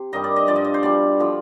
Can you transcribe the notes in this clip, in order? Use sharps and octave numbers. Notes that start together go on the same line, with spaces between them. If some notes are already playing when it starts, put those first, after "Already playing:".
Already playing: C3
G2 D#3 G3 D#5
D5
D#5
G2 F3 D5
D#5
D5
C5
B2 G3 D5
D3 F3